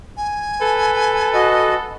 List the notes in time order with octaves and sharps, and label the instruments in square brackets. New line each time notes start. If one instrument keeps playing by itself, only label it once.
[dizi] G#5
[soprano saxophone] A4 [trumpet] B4
[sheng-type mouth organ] F#4 D#5